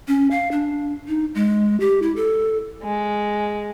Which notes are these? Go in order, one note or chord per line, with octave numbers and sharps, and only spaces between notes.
C#4
F5
D4
D#4
G#3
G4
E4
A4
G#3